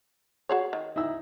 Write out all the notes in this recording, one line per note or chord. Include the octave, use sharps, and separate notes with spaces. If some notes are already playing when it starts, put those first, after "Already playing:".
F#4 G#4 C#5
D#3
D#4 E4 E6